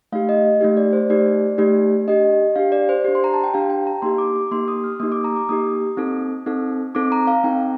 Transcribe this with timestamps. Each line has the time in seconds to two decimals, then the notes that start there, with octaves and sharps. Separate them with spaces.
0.12 A3 D#4 G4 F5
0.29 D#5
0.61 A3 D#4 G4
0.77 D5
0.93 C5
1.10 A3 D#4 G4 D5
1.58 A3 D#4 G4
2.07 D4 G4 D#5
2.56 D4 G4 F5
2.72 D5
2.89 C5
3.04 D4 G4
3.15 C6
3.24 A#5
3.34 A5
3.44 G5
3.54 D4 G4 F5
3.70 G5
3.87 A#5
4.02 A#3 D#4 G4 C6
4.18 D6
4.36 D6
4.51 A#3 D#4 G4 C6
4.68 D#6
4.84 F6
5.00 A#3 D#4 G4 D#6
5.12 D6
5.24 A#5
5.36 D6
5.49 A#3 D#4 G4 D#6
5.97 C4 D#4 A4
6.46 C4 D#4 A4
6.95 C4 D#4 A4 D6
7.12 A#5
7.27 F5
7.44 C4 D#4 A4 G5